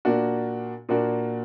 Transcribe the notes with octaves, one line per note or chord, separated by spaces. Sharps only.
A#2 A#3 D4 F#4
A#2 A#3 D4 F#4